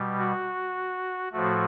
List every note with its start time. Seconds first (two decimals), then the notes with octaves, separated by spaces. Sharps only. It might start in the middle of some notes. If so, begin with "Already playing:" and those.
Already playing: B2 G3
0.18 F#4
1.32 A2 F3 A3 F#4